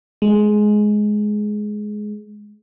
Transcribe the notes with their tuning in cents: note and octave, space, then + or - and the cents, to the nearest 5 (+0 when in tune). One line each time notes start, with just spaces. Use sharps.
G#3 +15